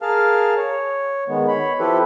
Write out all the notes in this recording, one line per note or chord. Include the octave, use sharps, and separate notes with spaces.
G#4 A#4 F5 A5 F6
C#5
D#3 G#3 B3
C#5 B5
F3 C4 E4 G4 A4 B4